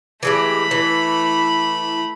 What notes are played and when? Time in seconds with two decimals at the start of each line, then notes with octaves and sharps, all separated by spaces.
0.23 E3 G#3 A3 G4 B5
0.71 E3